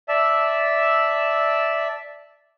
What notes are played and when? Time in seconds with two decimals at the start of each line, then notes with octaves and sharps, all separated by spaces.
0.08 D5 E5 A5 E6